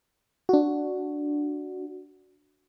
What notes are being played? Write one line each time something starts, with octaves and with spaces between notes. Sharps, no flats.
D4 F#4